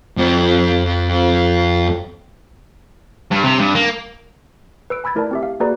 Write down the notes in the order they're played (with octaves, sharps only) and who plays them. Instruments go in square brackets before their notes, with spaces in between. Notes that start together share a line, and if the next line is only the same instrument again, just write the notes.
[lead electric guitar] F2 F3
[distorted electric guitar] G2
C3
G2
A#3
[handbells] B4 E6 D7
G#5 B5 E6 G#6 A6
A3 E4 A#4 B4 D5 A5
C4 G4 E5
F5
A#3 F#4 G#4 B4 D5 A#5